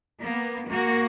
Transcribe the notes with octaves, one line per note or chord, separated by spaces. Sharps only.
A#3 B3
A#3 F#4